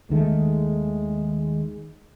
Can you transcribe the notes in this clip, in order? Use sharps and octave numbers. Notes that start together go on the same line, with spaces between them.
D#2 D#3 G#3 A3